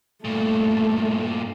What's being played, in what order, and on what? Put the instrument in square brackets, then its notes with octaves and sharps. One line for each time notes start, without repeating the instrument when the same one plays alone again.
[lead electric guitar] G2 A#2 [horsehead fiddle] A3